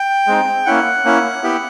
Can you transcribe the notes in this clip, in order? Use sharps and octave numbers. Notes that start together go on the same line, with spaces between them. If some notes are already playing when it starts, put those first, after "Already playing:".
Already playing: G5
G#3 C4 D#4
A#3 C#4 E4 F#5
A#3 C#4 E4
B3 E4 G4